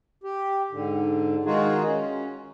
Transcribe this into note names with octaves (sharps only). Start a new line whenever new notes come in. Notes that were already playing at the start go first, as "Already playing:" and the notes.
G4
G#2 D3
D#3 G#3 D#4 F4 F#4 G#4
C#4